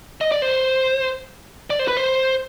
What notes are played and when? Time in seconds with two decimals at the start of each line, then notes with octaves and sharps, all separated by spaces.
0.21 D#5
0.32 D5
0.42 C5
1.70 D5
1.79 C5
1.88 B4
1.97 C5